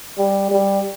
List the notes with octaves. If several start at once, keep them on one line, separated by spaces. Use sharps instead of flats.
G3
G3